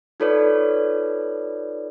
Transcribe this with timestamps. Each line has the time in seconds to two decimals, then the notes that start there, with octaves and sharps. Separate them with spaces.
0.20 D#4 F4 A4 B4 C#5 D5